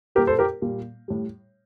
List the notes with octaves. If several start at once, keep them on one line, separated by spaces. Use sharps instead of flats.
A#2 G3 G4 A#4
A4 C5
G4 A#4
A#2 G3
A2 G3